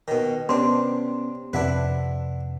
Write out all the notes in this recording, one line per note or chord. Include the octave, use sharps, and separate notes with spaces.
B2 D#3
C3 B3 C#4 D4 C6
F2 C3 D4 E4 B4 F#5